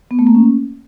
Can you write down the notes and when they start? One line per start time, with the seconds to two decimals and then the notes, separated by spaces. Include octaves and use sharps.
0.11 B3
0.19 A3
0.27 A#3
0.35 C#4